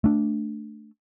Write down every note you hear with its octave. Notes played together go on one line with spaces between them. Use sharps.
A3 D4